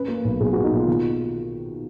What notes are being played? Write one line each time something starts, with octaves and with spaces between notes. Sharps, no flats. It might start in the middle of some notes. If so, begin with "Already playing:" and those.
Already playing: C#4 B4
A#3
B1
B1 G#4
A#3 F#4
D#4
B2 F4
D#3